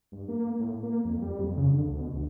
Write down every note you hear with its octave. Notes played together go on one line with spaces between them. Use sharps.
G2
A#3
A2
A#3
F2
G3
F2
C#3
D3
D2
B2
D2